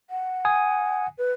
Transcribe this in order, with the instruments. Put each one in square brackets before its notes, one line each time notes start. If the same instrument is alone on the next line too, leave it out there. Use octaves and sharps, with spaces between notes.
[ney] F#5
[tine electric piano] G#5 D#6
[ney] B4